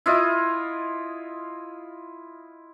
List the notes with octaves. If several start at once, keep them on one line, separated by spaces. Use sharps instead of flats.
E4 F4 D#5